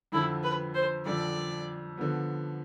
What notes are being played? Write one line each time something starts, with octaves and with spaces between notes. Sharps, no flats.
F2 D3 F3 E4
B4
C5
F2 D3 F3 D5
D3 F3 B3